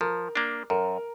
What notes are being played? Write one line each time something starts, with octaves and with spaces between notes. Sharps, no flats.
F3 A#4
A#3 D4
F#2 A#4